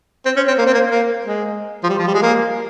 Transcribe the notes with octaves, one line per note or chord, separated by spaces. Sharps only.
C4
C#4
C4
A#3
C4
A#3
A#3
G#3
F3
G3
F3
G3
G#3
A#3